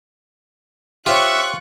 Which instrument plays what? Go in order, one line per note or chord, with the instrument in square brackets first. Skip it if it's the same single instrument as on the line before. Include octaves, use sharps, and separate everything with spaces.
[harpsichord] F4 [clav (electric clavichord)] G4 C5 C#5 [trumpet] E5 [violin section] C#6 F#6